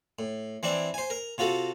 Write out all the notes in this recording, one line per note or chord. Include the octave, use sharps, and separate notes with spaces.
A2
E3 C4 D4 E4
C5 G#5
A#4
C3 F4 F#4 A4